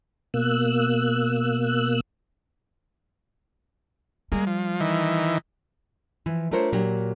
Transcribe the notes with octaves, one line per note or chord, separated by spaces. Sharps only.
B2 A#3 E6 F#6
G3 G#3 A#3
F3
D#3 E3
E3 F3 E4
A3 D4 F4 A#4 C5 C#5
A#2 F#3 G4 A#4